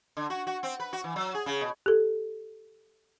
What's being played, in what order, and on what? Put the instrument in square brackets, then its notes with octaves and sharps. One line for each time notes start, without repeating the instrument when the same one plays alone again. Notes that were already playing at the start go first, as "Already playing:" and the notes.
[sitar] D3
F#4
F#4
C4
B4
F#4
E3
F#3
G#4
C#3
B2
[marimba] G4 A4